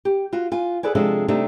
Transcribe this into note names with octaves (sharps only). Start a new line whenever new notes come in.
G4
F4 F#4
F4 G#5
G#4 A4 B4 D5 G#5
C3 F3 G#3 D4 F4 A4
C3 G3 A3 D4 D#4 A4